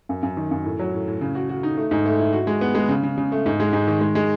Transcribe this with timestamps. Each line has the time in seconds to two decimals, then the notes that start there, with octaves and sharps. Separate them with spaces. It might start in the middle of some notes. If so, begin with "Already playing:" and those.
0.09 F#2
0.23 F#2
0.37 D#3
0.51 F#2
0.65 A2
0.79 F#3
0.93 A2
1.08 A2
1.21 C#3
1.35 F#4
1.49 F#4
1.63 D#4
1.77 A3
1.91 G#2
2.06 A3
2.19 E4
2.33 F#4
2.47 G#3
2.61 B3
2.75 G#3
2.89 C#3
3.03 C#3
3.18 C#3
3.32 A3
3.46 G#2
3.60 G#3
3.73 G#2
3.88 D#3
4.01 G#3
4.15 G#3